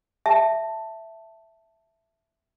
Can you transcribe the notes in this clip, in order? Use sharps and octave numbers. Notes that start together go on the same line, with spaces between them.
E5 A5